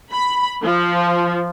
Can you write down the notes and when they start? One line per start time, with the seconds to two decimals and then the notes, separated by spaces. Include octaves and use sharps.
0.12 B5
0.63 F3